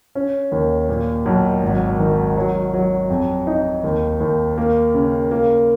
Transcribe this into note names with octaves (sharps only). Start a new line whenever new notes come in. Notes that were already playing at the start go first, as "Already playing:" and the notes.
C#4
D#2
A#2
B1
G#1
D#3
F#3
F#3
F2
D#4
D#2
D#2
A#3
C#3
A#3